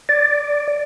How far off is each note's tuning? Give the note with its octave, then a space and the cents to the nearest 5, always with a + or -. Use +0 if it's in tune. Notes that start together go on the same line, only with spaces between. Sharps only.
D5 -5